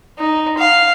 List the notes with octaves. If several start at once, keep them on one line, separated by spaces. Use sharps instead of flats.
D#4
F5